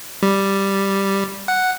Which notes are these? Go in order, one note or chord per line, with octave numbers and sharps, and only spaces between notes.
G3
F#5